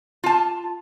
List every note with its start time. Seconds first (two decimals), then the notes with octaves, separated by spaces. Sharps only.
0.24 F4 A5